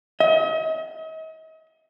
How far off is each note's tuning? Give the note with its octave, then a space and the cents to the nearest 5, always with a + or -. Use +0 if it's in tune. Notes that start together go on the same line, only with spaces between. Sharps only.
D#5 +40